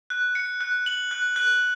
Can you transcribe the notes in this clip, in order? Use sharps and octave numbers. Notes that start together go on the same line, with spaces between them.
F#6
C#7
F#6
F#7
F#6
F#6